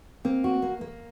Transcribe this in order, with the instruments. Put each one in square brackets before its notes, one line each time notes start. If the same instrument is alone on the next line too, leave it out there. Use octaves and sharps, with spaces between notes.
[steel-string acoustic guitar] A#3 [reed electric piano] C4
[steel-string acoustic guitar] F#4
A#3
A#3